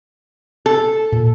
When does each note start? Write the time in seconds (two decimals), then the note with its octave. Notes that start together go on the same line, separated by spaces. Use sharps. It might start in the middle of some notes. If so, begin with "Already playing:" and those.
0.66 A4
1.12 A#2